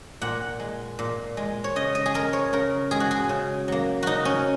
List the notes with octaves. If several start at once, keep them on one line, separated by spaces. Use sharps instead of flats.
A#2 F#5
G#3
A#2
G#3
C#5
C#3 D#5
D#5
G#4
G#3 A#4
C#5
C#3 A#4
G#3 G#4
F#4
G#4
C#3
F#3 A#3
C#3 D#4 F#4
C#4